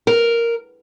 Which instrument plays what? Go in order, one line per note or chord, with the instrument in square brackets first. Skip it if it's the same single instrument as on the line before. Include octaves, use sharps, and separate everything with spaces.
[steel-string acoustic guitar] A#4